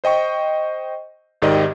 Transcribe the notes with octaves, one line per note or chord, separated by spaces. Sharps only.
C5 D#5 G5 C#6
G#1 G#2 D#3 G4 D5 D#5